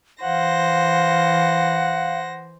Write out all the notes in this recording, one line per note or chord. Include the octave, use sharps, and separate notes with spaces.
E3 C5 F5 F#5 A#6